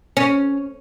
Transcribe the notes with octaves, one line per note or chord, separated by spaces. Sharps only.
C#4